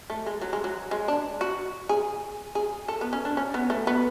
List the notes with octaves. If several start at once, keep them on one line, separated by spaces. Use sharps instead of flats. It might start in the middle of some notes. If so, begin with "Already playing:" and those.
A3
G#3
F#3
G#3
F#3
G#3
D4
F#4
G#4
G#4
A4
B3
C#4
D4
C#4
B3
A3
B3